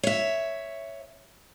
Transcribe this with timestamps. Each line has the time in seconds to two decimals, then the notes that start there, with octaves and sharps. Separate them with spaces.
0.03 C#5 E5